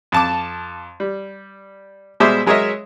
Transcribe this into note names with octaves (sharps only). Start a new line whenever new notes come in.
F2 A5 D6
G3
B2 G3 G#3 C5 E5 D6
F#3 G#3 A#4 C#5 D#5 E5